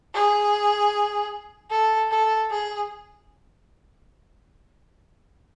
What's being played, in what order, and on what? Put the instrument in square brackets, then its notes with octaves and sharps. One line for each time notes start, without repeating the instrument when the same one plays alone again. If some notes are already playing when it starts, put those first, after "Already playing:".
[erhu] G#4
A4
A4
G#4